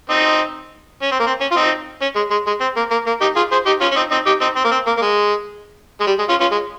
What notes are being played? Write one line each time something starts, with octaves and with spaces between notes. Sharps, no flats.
C4 D#4
C#4
C4
A#3
C4
C#4
F4
C4 D#4
C#4
G#3
G#3
G#3
C4
A#3
A#3
A#3
D#4 G4
F4 G#4
G#4 C5
D#4 G4
C#4 F4
C#4
C4 D#4
C4 D#4
D#4 G4
C4 D#4
C4
A#3
C4
A#3
A#3
G#3
G#3
G3
G#3
C#4 F4
C#4 F4
G#3